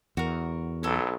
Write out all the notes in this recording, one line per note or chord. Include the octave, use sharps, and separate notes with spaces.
E2 F#4 A#4
B1 A4 C#5